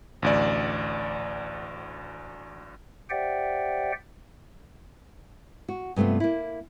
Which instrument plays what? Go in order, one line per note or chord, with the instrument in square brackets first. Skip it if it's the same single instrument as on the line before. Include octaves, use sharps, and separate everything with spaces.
[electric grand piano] A1 D2 D5
[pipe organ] G4 C5 D5 E5 F#5 G5
[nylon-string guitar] F#4
G2 C3 A3 B3 F4
A#3 E4